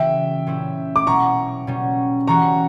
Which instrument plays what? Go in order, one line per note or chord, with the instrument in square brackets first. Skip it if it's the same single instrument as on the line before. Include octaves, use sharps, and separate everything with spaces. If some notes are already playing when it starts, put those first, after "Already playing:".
Already playing: [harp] C#3 E3 A#3 F#4 [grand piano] E5 G5
[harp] A#2 G3 C#4 E4
[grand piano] D6
[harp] B2 F#3 A#3 E4 [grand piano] A#5 C#6
[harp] B2 G3 C#4
[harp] E3 G3 C#4 F#4 [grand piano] A#5 C#6